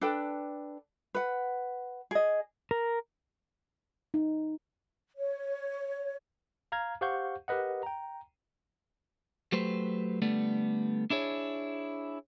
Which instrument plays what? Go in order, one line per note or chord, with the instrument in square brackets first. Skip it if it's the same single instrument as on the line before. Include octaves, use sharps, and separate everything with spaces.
[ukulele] D4 A4 B4 G5
B4 F#5
G#4 D#5
[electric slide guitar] A#4
[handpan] D#4
[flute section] C#5
[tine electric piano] F5 A#5 F6 G#6
G4 C5 F5 F#5 C#6 G6
G4 A#4 B4 D#5 F#5
G5 A#5
[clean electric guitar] F#3 A3 G4 B4 C5
D3 G3 A3 B3
D4 E4 G#4 C#5